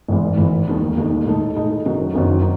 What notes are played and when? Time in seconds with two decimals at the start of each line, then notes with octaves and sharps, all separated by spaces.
0.08 G#1 G#2 E3
0.37 G#1 G#2 E3
0.68 E1 D#2 D#3 A3 D#4
0.97 E1 D#2 D#3 A3 D#4
1.26 A2 G#3 D#4 A4 D#5
1.56 A2 G#3 D#4 A4 D#5
1.86 F#1 F#2 D#3 F#3
2.15 F#1 F#2 D#3 F#3